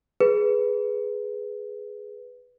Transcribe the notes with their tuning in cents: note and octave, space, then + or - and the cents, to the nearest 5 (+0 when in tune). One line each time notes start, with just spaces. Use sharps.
G#4 +5 B4 +0